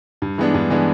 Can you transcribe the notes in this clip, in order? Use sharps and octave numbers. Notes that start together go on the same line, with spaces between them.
G2
E3 G#3 B3 D4
G2
E3 G#3 B3 D4